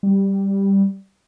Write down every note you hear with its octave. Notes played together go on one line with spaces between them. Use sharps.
G3